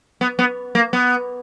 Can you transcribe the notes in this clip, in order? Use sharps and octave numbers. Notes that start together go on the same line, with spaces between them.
B3
B3
A#3
B3